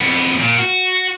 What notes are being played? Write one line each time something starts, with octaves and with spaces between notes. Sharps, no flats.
F2 B3
A#2
F#4